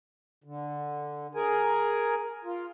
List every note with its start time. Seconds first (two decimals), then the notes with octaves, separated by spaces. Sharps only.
0.44 D3
1.35 G#4 A#4 G#5
2.44 F4